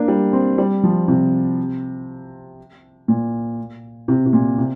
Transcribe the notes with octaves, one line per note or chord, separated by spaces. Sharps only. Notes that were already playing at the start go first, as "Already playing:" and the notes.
Already playing: A#3 D4
G3
C4
G3
F3
C3
A#2
C3
C3
A#2
C3